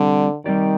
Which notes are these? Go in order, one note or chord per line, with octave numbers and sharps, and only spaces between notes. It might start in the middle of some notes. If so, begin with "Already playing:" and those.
Already playing: D3 G3 C4 G4 D5
D#3 G3 C4 G4 D5